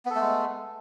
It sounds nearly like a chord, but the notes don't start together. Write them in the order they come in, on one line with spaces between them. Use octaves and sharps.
B3 A4 A3 G#3